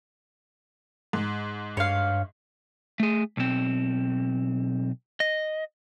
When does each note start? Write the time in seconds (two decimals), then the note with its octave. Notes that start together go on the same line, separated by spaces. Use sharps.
1.13 G#2
1.77 G2 C#5 F5
3.00 A3 G#4
3.37 B1 C4
5.20 D#5